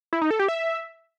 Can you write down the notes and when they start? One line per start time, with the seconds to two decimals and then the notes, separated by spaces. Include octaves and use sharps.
0.13 E4
0.22 D#4
0.31 A4
0.39 G4
0.48 E5